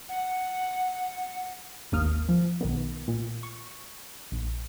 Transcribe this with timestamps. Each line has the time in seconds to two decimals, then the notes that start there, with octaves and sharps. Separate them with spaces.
0.09 F#5
1.92 G#1 D#2 A#3 D#6 F6
2.29 F3
2.61 B1 D#3 B3
3.08 A#2
3.43 C#6
4.32 A#1